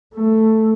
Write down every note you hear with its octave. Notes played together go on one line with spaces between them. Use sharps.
A3